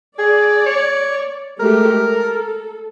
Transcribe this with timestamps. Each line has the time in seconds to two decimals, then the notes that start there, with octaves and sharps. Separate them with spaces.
0.19 G#4 D5
0.66 C#5
1.60 G#3 A3 G4 A#4
2.00 A4